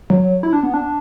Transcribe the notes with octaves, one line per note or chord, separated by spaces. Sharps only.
F#3
E4
D4
B3
D4